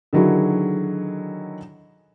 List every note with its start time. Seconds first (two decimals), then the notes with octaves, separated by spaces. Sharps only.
0.13 D3 D#3 F#3 E4 F#4 G#4